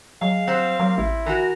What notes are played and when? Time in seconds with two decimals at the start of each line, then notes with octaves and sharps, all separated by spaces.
0.22 F#3 G#3 F5
0.48 G3 C4 C5 F#5
0.80 F#3 A#3
0.98 A1 E4
1.26 E3 F#4 A#4